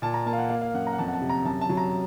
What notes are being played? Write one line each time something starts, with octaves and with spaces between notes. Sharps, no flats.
A#2 A5
A#5
A#3 A5
F5
F#5
A#3 F5
F5
F#2 F#5
A#5
F#5
F2 A5
F#5
A5
C3
A#5
F#2 A5
A5
F#3
A#5